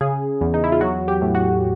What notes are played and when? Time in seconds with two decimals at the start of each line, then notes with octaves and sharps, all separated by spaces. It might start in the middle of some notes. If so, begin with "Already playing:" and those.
0.01 C#3 G#4
0.41 E2
0.54 D#4
0.64 E4
0.72 F4
0.81 F#3 F#4
1.08 G4
1.22 A2
1.35 F#4